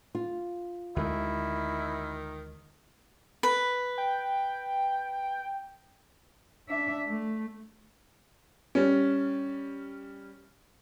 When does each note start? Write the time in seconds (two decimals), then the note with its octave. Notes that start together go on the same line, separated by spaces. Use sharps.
0.15 F4
0.96 D2 D#3 G#3 E4
3.43 B4
3.98 G5
6.69 D4 E5
7.07 A3
8.75 G3 C#4